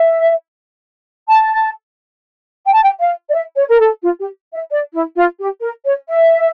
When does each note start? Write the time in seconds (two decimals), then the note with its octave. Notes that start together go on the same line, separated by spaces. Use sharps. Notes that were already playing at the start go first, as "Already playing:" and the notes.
Already playing: E5
1.28 A5
2.66 G5
2.74 A5
2.83 G5
3.00 F5
3.30 D5
3.33 E5
3.56 C#5
3.68 A#4
3.80 A4
4.03 F4
4.19 G4
4.54 E5
4.71 D5
4.94 E4
5.17 F4
5.40 G4
5.62 A#4
5.85 C#5
6.09 E5